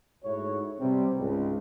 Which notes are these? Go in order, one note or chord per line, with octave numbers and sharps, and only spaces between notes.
G#2 A3 E4 F#4 C#5
C3 G3 B3 C4
C#2 G#2